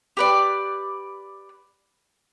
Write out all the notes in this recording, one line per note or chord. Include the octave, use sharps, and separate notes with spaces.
G4 B4 D5